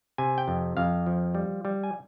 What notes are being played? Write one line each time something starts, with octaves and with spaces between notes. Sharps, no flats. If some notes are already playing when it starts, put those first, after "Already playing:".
C3 G#5
G5
F2
F2 F5
F3
G3
G3
G#5